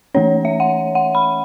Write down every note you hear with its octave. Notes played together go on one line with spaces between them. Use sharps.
E3 A3 C#4 C#5
E5
F#5
F#5
B5